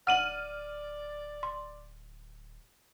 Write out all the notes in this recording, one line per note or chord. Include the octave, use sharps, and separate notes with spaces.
D1 D5 F#5 F6 D#7 F#7
C6